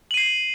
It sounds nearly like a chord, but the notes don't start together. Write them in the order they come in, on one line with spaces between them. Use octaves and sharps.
F#7 D#7 C7